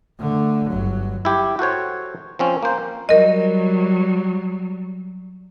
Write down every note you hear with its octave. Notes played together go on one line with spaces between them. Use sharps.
D3 A3
G1 F#3
E4 G4
F#4 A4 C5 C#5
F3 C4 C#4
A#3 C5
F#3 G3 A#4 D#5